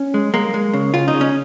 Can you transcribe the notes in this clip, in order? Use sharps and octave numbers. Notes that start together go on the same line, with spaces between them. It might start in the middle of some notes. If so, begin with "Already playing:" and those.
Already playing: C#4
G#3
G#3 A#3
G#3
C#3
C#3 F4
D#4
C#3
C#4